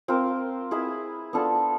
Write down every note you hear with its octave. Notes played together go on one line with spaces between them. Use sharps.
C4 F4 A#4
E4 G#4 B4 E5
B3 D4 F4 A4